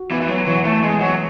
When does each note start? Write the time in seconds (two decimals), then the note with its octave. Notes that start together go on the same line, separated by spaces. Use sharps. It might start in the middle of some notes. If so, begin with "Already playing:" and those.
Already playing: F#4
0.10 E3 B3
0.21 E3
0.28 F#3
0.46 E3 F#3
0.65 A3
0.83 G#3 B3
1.01 F#3